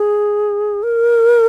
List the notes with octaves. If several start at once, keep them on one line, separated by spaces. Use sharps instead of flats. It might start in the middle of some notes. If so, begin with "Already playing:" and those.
Already playing: G#4
A#4